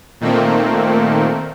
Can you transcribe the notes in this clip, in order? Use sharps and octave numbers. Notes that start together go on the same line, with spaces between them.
A#2 D#3 A3 A#3 C4